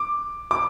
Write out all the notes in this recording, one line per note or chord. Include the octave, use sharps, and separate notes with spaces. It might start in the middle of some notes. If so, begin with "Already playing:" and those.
Already playing: D6
D6